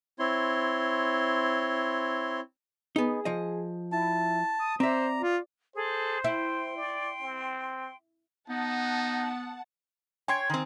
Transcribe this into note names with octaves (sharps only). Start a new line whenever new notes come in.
C4 E4 C#5 C6
B3 D#4 G#4
F3 D#5
E4 A5
D#6
C4 C5 D5 E5 A#5
F4
G#4 A4 C5
E4 G5 C6
D5
C4
B3 D#4 F#5 A5
C#5 G5 G#5 C6 G#6
D#3 C4